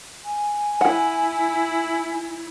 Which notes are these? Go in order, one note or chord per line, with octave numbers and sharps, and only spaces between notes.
G#5
E4 F#5